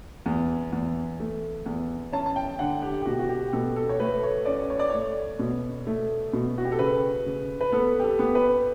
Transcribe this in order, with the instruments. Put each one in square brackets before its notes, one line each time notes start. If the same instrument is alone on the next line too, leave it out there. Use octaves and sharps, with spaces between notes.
[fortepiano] E2
E2
A3
E2
[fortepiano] C#4 [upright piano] A5
[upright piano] A5
G5
[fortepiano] D3 [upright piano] F#5
[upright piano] G4
G4
[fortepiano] B2 [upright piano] F#4
[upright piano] F#4
G4
[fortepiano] B2 [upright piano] A4
[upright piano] A4
C#5
[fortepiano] A3 [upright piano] B4
[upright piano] C#5
[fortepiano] C#4 [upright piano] D5
[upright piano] C#5
D5
[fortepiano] A3 [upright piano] C#5
[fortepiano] B2
A3
B2
[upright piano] F#4
G4
A4
[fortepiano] C#3 [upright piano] B4
[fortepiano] C#3
[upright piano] B4
[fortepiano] B3 [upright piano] A4
[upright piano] G4
A4
[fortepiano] B3
[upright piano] B4